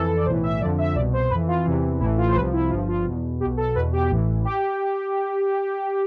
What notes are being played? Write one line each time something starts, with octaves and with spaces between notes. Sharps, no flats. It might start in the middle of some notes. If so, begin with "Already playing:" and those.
Already playing: F2 E3 A4
D5
B1 A2 E3 C5
E5
F2 D3 F3 D5
E5
C2 B2 D5
C5
F2 E3 B4
F4
E2 C3 E3
A1 A2 E3 E4
F4
C5
C2 C3 F3 B4
E4
G1 G2 F3 F4
F4
E2 B2
B1 B2 G4
A4
E2 B2 B4
G4
A1 A2 E3
G4